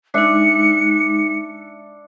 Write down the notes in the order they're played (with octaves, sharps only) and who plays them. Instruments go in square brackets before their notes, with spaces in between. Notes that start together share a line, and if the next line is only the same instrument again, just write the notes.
[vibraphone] G#3 D#4 [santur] D4 E5 [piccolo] C#7